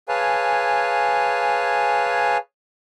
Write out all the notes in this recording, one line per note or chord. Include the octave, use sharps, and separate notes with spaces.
G#4 B4 C#5 F5 G#5 A5